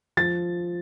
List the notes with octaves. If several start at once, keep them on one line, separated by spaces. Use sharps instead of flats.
F3 A6